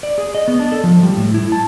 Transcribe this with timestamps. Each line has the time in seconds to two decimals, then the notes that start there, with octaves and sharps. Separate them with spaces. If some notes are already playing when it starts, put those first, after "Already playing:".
0.03 D5
0.18 G#4
0.35 D#5
0.48 B3
0.59 D4
0.72 A4
0.84 F3
1.03 G3
1.17 A2
1.34 E4
1.52 A5